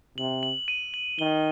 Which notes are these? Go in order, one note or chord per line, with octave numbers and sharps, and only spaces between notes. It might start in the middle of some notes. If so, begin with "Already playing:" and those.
C3 F#7
F#7
D#7
F#7
D#3 G7